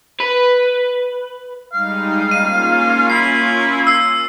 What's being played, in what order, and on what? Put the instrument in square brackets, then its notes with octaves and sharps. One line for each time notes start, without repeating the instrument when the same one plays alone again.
[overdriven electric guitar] B4
[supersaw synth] G3 G#3 D#4 [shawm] F5
[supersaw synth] A#3 C#4 F4 [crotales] D#7
[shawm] E4 [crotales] C7
[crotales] E6 C7